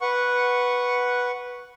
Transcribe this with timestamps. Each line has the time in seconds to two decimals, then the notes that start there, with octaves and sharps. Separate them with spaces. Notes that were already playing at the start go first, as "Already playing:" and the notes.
0.01 B4 F#5 C#6